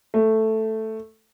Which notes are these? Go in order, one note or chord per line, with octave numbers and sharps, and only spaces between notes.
A3